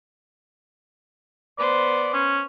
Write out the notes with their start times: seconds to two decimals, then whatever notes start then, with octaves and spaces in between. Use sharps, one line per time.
1.59 B3 B4 C5 D5
2.13 C#4